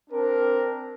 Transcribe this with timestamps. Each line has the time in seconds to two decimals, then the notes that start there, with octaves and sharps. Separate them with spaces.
0.10 C4 D4 A#4